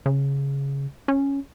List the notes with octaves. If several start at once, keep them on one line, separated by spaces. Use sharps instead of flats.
C#3
C#4